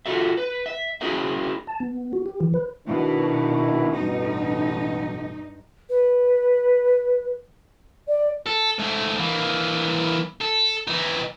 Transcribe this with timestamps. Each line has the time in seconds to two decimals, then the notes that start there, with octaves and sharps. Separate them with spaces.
0.06 F4 F#4 A4 E5
0.37 B4
0.66 E5
1.01 C#4 E4 F#4 G#4 A#4 E5
1.67 A5
1.80 B3
2.13 F#4
2.26 G4
2.41 E3
2.54 B4
2.87 B2 D#3 D4 E4
3.94 A1 G2 B2 D#4
5.89 B4
8.07 D5
8.47 A4
8.79 G#2 A3
9.18 E3 A#3
10.42 A4
10.88 E3 D#4